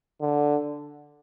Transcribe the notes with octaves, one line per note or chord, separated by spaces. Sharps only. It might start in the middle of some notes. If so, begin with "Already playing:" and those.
D3